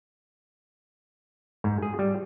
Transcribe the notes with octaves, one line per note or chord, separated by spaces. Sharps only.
G#2
G#4
G3